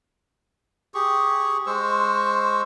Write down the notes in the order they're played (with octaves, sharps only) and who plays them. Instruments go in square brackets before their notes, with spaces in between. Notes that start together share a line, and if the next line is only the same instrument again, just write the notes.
[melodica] G4 G#4 C#6
G#3 C5 C#6 E6